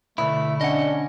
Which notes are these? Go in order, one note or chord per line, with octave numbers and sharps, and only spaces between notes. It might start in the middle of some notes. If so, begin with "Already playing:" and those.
B2 D3 A3 E4
C#4 D4 D#5 F#5